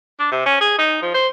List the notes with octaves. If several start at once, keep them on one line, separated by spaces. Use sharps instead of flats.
D4
C3
C#4
G#4
D#4
F3
C5